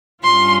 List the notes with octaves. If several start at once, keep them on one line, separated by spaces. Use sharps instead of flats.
G2 G3 C#4 F4 C6